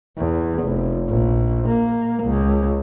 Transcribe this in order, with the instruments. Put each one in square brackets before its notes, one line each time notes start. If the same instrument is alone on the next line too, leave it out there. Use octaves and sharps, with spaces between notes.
[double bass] E2
F1
A#1
A#3
C#2